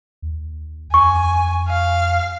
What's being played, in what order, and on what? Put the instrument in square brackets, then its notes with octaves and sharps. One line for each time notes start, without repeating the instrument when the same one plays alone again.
[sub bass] D#2
[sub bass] F2 [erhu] G#5 [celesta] C#6
[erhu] F5